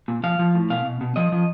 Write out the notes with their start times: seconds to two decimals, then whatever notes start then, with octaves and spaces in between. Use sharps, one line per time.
0.08 A#2
0.23 F3 F5
0.39 F3
0.55 A2
0.70 B2 F5
0.85 B2
1.01 B2
1.16 F3 D#5
1.32 F3